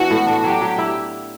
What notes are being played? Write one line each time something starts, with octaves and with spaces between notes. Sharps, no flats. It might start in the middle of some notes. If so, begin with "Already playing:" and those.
Already playing: E3 B3 D4 F#4
A2
D4
F#3 G4
F#3
E4